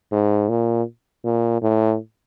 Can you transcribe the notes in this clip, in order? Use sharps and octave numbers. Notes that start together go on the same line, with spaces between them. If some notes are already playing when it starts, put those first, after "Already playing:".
G#2
A#2
A#2
A2